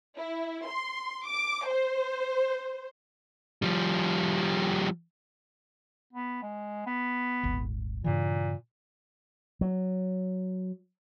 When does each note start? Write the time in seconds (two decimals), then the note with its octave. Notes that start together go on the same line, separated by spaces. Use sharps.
0.19 E4
0.69 C6
1.28 D6
1.70 C5
3.62 F3 G3
6.13 B3
6.43 G#3
6.87 B3
7.43 D#1 G#1
8.04 G2 A#2 C#3 E3
9.61 F#3